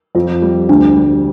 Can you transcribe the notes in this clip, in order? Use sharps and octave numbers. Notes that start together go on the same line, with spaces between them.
F2 F4
G3
D2 D4
G3